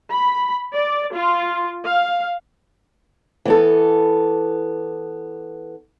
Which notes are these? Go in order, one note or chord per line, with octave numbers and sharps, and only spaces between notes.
B5
D5
F4
F5
E3 B3 A4